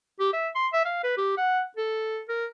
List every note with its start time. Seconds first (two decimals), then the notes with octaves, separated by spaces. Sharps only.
0.20 G4
0.33 E5
0.55 C6
0.73 E5
0.85 F5
1.03 B4
1.17 G4
1.37 F#5
1.77 A4
2.29 A#4